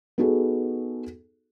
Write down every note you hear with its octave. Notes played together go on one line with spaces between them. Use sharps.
B3 D#4 F#4 G#4 A4